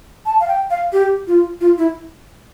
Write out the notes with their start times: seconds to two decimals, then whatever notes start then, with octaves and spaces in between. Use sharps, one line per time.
0.26 A5
0.40 F5
0.48 G5
0.71 F5
0.93 G4
1.27 F4
1.61 F4
1.78 E4